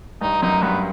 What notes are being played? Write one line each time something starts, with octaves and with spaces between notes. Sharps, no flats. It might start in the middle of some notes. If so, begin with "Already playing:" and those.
G2 D#4
F#2 D#4
G2 B3